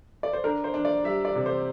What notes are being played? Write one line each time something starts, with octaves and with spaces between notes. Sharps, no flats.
D5
C5
D4 A#4
C5
D4
D5
G3 E5
D5
C3
C5